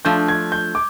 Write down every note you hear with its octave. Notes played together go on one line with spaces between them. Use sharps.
F3 A3 D4 G6
G#6
G6
D6